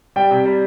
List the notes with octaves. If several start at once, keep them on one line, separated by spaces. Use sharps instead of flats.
G3 G5
C3
G3